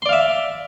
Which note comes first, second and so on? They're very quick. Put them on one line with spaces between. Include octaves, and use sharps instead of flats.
C6 D5 F5 E5